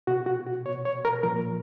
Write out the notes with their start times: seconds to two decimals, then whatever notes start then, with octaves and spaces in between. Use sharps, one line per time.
0.07 B2 F#4
0.26 F#4
0.47 F#4
0.66 B2 C#5
0.85 C#5
1.05 A#4
1.23 A#2 F3 A#4